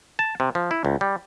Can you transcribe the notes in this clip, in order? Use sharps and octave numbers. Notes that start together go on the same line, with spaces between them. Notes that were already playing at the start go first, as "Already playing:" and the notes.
A5
C3
F3
E4
C#2
G3